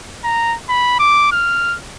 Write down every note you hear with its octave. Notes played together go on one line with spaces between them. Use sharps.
A#5
B5
D6
F6